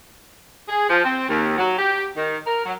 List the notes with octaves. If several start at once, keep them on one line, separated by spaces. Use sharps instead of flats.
G#4
F3
C4
D#2
F#3
G4
D#3
A#4
F#3